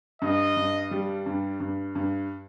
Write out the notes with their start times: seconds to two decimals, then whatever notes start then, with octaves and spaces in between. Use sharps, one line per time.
0.22 G2 D#5
0.57 G2
0.91 G3
1.26 G2
1.60 G2
1.95 G2